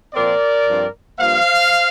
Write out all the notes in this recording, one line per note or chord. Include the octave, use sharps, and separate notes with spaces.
A#2 F3 C4 A#4 D5
G2 F3 C4
G2 F3 A#3 C5 F5